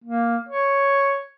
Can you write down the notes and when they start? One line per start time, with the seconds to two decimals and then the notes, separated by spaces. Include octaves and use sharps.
0.04 A#3
0.49 C#5